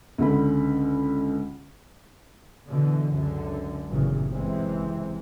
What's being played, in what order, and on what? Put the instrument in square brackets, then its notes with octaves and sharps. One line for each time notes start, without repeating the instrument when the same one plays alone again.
[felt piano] C#2 D3 B5
[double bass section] B2 D3 E3
C#2 F#2 D3
G1 A#2 C#3 E3 F#3
F#1 C3 E3 G#3 C4